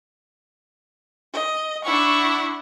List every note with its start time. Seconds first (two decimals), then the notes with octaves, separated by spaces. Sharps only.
1.33 D#5
1.84 D4 E4 F#5 C#6